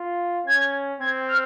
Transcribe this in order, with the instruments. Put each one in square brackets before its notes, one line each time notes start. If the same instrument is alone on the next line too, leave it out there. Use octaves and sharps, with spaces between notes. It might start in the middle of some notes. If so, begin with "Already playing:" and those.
Already playing: [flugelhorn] F4
[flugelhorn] C#4 [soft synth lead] G#6
[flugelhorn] C4 [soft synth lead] G#6
[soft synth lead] F6